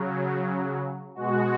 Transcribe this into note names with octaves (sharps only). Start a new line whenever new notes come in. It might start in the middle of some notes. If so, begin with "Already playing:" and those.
Already playing: C#3 F#3
B2 G#3 F#4